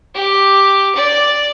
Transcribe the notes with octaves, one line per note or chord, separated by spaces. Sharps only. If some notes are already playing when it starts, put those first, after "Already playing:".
G4 D6
D5